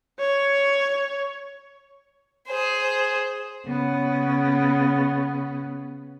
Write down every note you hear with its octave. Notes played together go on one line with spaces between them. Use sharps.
C#5
G#4 C5
C#3 B3